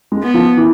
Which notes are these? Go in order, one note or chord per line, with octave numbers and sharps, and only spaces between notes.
G#3
B3
F3
E3